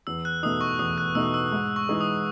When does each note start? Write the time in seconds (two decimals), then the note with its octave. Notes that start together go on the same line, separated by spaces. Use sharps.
0.07 E2 E6
0.25 F#6
0.43 B2 A3 D#4 D#6
0.61 C#6
0.79 E2 D#6
0.98 F#6
1.15 B2 A3 D#4 E6
1.34 E6
1.52 G#2
1.76 C#6
1.89 E3 G#3 D#4 G#4
2.01 D#6